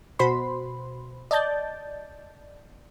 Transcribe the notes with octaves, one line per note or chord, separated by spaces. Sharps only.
B2 F#4 C5 B5 C6
D5 D#5 A5 G6 A6